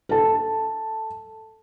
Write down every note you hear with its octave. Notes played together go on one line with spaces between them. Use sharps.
A4 A5